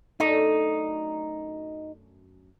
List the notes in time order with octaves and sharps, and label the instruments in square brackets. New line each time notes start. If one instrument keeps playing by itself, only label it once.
[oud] F#2 A3 D4 [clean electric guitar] D#4